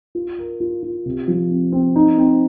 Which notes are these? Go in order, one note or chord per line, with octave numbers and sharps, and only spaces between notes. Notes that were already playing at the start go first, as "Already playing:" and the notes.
F4
A#4
F4
F4
C3
F3
C4
C4
D#4
C4